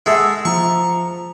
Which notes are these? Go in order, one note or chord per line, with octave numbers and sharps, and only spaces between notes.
G#3 A3 E5 F#5
E6
F3 A#5 C#6